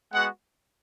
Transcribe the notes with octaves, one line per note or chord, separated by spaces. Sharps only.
G#3 B3 F#4 F#5